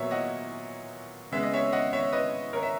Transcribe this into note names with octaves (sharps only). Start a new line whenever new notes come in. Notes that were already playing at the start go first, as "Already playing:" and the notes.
Already playing: A#2 F#3 B3 C#5 E5
D#5 F#5
C#3 G#3 B3 E5
D#5
C#5 E5
D#5 F#5
C#5 E5
B4 D#5
A#4 C#5
E5